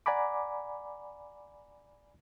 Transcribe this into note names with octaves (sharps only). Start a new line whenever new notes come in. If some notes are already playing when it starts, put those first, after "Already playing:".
D5 F#5 G#5 A#5 B5 D6